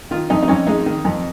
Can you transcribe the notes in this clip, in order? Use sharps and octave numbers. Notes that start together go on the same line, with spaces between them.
D#3 F4
F2 D#4
D#4
F2 C#4
G#3 D#4
D#3
F2